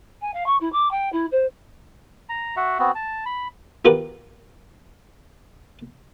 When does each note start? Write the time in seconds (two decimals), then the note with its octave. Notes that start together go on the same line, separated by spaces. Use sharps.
0.21 G#5
0.34 F5
0.46 C#6
0.61 E4
0.72 D6
0.91 G5
1.12 E4
1.32 C5
2.29 A#5
2.56 F#4 E5 F#5
2.79 B3 C4 F#4
2.95 A5
3.25 B5
3.85 B3 F4 G4 A#4 B4